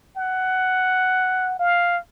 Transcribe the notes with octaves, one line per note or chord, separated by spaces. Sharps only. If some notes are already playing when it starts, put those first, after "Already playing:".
F#5
F5